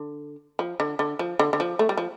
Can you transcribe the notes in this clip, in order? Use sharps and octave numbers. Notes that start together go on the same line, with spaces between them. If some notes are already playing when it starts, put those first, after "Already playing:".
Already playing: D3
F3
D3
D3
F3
D3
D3
F3
A3
G3
F3